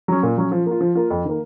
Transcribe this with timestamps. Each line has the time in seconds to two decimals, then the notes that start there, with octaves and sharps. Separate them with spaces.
0.08 F#3 C#4
0.23 A#2
0.38 F#3 C#4
0.52 F3
0.66 A#3 F4
0.81 F3
0.95 A#3 F4
1.10 F2
1.25 D#3 A#3